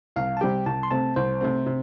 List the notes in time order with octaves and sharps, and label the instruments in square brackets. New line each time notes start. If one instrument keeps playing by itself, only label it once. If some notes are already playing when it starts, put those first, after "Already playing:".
[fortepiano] C2 [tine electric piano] F5
[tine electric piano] A5
[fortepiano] C3 G3 C4 G4 [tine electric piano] G5
[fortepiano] C2 [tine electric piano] A5
[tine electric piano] C6
[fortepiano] C3 A3 C4 [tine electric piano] A5
[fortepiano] C2 [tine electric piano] C5
[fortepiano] C3 A3 C4
C3